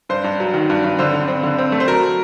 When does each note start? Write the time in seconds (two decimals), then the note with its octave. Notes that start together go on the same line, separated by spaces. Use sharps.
0.09 G2 C5
0.24 G2
0.40 F#3
0.54 D#3
0.70 G2
0.84 G2
0.99 D3 C5
1.14 D3
1.28 C4
1.43 D3
1.58 C4
1.72 A3
1.80 C5
1.87 F#3 A#4